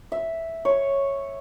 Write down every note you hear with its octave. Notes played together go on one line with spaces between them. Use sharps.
E5
C#5